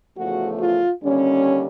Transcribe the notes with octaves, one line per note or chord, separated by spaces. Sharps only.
E2 C#3 F3 A3 F#4
F4
D#2 D3 G3 C#4